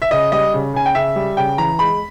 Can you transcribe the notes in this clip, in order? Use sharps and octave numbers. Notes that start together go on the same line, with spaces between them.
E5
C#3 D#5
G3 D#5
C#3
C#3 G#5
G5
C#3 E5
G3
C#3 G5
E3 A#5
G#3 B5